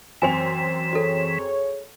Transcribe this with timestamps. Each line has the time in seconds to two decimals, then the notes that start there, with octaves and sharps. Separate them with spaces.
0.22 F#2 E3 C4 G#5 F7
0.93 F#4 G#4 A4 C#5